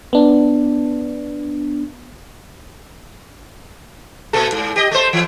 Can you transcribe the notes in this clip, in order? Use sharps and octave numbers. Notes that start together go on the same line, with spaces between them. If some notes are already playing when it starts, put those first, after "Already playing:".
B3 D4
A#2 A3 A4
G#2
G4 D#5
A3 C5
E3